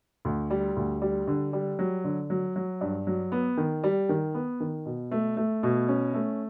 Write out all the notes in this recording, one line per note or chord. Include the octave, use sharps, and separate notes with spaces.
D2
G3
D2
G3
D3
G3
F#3
D3
F#3
F#3
G2
F#3
B3
D#3
G3
D#3
B3
D#3
B2
A3
A3
B2
C#4
A3